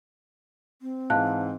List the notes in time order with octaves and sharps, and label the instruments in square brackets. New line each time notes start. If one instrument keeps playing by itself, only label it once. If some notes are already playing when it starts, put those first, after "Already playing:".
[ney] C4
[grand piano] G#2 E3 [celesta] F5 A5 F#6